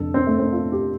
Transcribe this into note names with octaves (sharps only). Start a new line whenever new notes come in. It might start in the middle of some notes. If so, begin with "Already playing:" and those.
Already playing: F1 F2 D3 A4
C4
A3
C4
F4
G4